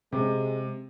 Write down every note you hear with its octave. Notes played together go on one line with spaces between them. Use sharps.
C3 G#3